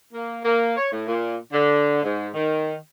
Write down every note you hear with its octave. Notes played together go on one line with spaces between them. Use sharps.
A#3
A#3
C#5
A2
A#2
D3
G#2
D#3